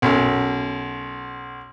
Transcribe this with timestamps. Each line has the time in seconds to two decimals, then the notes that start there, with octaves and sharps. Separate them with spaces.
0.02 B1 F#2